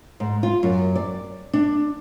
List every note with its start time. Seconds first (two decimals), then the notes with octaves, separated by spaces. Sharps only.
0.20 G#2
0.43 F4
0.63 F#2
0.96 D5
1.53 D4